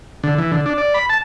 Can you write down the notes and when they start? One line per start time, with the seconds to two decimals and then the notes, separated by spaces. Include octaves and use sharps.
0.24 D3
0.38 E3
0.52 D3
0.66 D4
0.78 D5
0.94 B5
1.09 A5